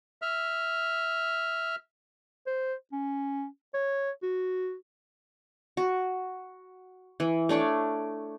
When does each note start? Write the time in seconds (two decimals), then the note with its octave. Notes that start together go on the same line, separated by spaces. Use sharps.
0.22 E5 F6
2.47 C5
2.92 C#4
3.74 C#5
4.23 F#4
5.77 F#4
7.20 E3
7.49 A3 D4 C#5 D5